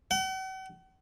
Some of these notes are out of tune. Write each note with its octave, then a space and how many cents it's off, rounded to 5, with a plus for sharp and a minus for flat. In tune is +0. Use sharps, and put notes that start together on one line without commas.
F#5 +45